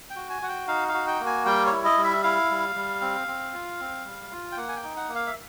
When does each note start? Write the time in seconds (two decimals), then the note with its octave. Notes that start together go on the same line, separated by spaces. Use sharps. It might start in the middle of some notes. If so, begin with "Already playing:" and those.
0.10 G5
0.16 F#4
0.30 G#5
0.42 F#4 F#5
0.49 G5
0.68 D#4 F5
0.88 F5
0.94 F#4
1.07 G5
1.20 A#3
1.26 G#5
1.46 G3 G5
1.66 C#5
1.72 E4
1.85 D#5
1.97 G3
2.04 E5
2.23 E4 F5
2.50 G3
2.75 G3
3.01 C4
3.28 C4
3.53 F4
3.80 C4
4.05 G3
4.32 F4
4.52 G5
4.57 A#3 F#5
4.69 G#5
4.76 G5
4.83 D#4
4.97 F#5
5.09 A#3
5.15 F5
5.27 E5